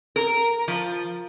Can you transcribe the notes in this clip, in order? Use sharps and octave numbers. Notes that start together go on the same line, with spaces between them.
A#4
F3